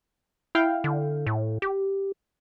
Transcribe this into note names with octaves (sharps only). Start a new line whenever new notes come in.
E4 F5 G5
D3
A2
G4